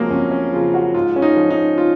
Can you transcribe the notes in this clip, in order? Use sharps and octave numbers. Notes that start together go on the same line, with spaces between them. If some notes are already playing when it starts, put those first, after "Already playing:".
Already playing: F2 C#3 F3 F#3 G#3 A#3
F2 C#4
C#4
C#3 F3 F4
F#4
G#2 F4
C#4
D#4
F3
D#4
F4